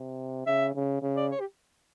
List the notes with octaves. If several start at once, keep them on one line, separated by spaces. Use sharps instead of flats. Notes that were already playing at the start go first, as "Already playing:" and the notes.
Already playing: C3
C#3 E5
C#3
C#3
D5
C#5
G4